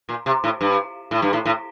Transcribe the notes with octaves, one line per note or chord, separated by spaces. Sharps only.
A#2
C3
A2
G2
A2
G2
A2
A2